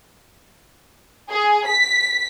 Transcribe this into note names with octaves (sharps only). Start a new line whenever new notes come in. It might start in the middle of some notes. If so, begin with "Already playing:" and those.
G#4
B6